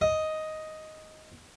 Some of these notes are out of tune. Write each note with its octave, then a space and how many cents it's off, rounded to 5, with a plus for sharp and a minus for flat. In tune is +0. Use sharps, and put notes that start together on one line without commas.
D#5 +5